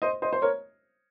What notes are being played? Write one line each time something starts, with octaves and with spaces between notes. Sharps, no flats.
C5 D#5
C5 D#5
C5
A#4 C#5